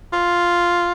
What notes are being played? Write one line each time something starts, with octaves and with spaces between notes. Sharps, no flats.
F4